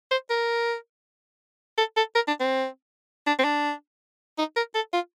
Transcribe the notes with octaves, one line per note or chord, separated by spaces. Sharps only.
C5
A#4
A4
A4
A#4
D4
C4
D4
C4
D4
D#4
A#4
A4
F4